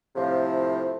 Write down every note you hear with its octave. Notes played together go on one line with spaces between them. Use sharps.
A2 C3 F3